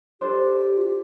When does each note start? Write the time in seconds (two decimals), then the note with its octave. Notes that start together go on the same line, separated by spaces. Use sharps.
0.21 D4 G4 A4 C5
0.77 F4
0.81 G4